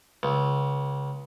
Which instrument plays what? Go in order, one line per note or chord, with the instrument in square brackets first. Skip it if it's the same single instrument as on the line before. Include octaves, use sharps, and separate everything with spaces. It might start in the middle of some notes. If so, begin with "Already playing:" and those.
[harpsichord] C#2